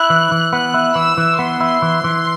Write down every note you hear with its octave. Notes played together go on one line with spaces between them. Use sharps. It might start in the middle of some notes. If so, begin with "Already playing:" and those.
Already playing: E4 F#6
E3
E3
B3 F#6
E4
E3 E6
E3
B3 C6
E4
E3
E3